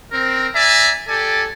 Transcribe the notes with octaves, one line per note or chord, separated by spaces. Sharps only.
C4 A#4
D5 E5 G#5 A#5
G4 A4 D5 G#5